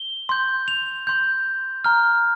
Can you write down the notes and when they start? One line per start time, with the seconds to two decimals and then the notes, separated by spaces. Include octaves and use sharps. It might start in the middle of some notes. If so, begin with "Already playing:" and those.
Already playing: G7
0.29 C6 G6
0.68 F7
1.07 C6 G6
1.84 A#5 F6